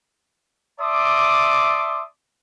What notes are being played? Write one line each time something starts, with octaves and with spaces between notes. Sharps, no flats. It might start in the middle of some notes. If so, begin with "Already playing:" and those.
D5 E5 A5 C6 D6 D#6